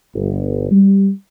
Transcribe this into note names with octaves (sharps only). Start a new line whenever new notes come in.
G1
G3